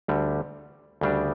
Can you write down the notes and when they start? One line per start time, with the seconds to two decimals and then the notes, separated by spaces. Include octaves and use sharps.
0.08 D2 D3 G3
1.01 D2 C#3 G3 D4